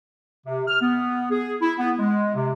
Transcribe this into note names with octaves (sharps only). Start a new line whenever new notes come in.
C3
F6
B3
G#4
E4
B3
G#3
C3